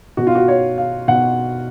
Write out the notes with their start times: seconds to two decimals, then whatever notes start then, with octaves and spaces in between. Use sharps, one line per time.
0.17 B2 F#4
0.27 F4
0.35 F#4
0.48 C#5
0.78 F5
1.08 B2 F#5